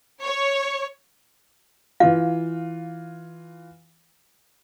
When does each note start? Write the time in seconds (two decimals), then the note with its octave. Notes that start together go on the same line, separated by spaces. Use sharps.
0.22 C#5
2.00 E3 F4 F5